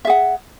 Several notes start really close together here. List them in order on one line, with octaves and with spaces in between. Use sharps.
E5 G#4 F#5